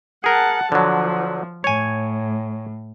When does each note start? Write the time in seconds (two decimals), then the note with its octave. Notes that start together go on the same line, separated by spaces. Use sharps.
0.24 G#4 A#4 F#5 A5
0.72 D3 F3 F#3
1.64 A2 C#5 G#5